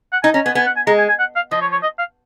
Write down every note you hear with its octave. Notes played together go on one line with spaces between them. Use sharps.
F#5
D#4 G#5
C#4 A#5
B3 G#5
B3 G#5
F#5
G#5
G#3 A#5
G#5
G#5
F#5
F5
F3 D#5
C#5
C#5
D#5
F5